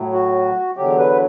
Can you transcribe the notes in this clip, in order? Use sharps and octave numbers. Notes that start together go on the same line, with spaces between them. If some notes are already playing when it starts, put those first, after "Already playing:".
Already playing: A2 F#3
F#4
E2 D3 F#3 G4
B4